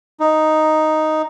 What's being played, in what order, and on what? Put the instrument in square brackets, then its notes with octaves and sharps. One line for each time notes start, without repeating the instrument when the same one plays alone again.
[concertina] D#4